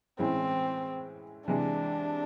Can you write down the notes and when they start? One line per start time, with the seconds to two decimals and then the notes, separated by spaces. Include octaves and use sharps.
0.19 A2 E3 G#3 C4 C#4 E4
1.47 C3 E3 G#3 D4